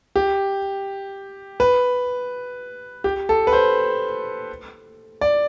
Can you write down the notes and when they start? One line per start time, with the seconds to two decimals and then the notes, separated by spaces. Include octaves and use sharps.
0.16 G4
1.60 B4
3.04 G4
3.29 A4
3.47 B4
3.53 C5
5.21 D5